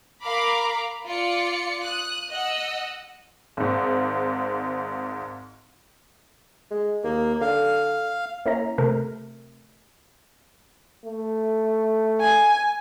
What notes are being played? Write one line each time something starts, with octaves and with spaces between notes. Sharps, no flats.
A#4 F5 A#5 B5 D6
F4 D5 C#7
D#6 F#6
D#5 F#5 E6 F#6
G#1 G#2
G#3
D#2 A#3
D3 F5
A#3 C#4 E4 A#5
C3 A3 A#4
A3
G#5